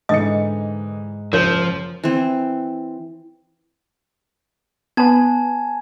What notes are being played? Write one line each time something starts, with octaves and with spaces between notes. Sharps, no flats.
G#2 D3 E3 D#4 D#5 D#6 C#7
F#1 F3 A#4 C5 C#5
E3 C4
B3 B4 G#5 A5 G#6